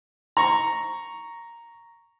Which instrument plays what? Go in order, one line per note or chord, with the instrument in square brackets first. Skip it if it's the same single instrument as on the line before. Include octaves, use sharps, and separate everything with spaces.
[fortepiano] A#5 C#6